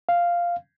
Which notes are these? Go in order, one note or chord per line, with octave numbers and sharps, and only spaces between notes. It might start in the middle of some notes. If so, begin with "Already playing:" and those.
F5